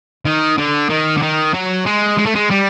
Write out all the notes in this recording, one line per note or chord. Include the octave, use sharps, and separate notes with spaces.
D#3
D3
D#3
D3
D#3
F#3
G#3
G#3
A3
G#3
G3